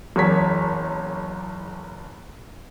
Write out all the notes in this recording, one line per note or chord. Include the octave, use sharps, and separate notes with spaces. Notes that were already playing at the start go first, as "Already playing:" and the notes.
F#1 E2 C#5 B6